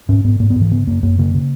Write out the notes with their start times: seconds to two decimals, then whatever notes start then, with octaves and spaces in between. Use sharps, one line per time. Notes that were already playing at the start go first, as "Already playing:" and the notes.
0.09 G#2 C#4
0.24 G#2 B3
0.40 G#2 A#3
0.50 B3
0.56 G#2
0.61 E3
0.71 C#3 B3
0.87 F#2 A#3
1.03 F#2 A#3
1.18 C#3 A#3
1.34 C#3